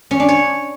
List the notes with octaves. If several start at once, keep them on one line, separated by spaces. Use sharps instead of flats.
C#4
D4
C#5